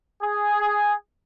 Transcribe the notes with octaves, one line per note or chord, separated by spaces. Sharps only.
G#4